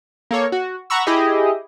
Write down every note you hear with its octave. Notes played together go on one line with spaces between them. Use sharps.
A#3 A4 C#5
F#4
F#5 A#5 B5 C#6 E6
E4 G4 G#4 D#5